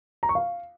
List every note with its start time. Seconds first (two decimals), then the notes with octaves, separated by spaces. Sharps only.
0.23 A#5
0.29 C#6
0.35 F5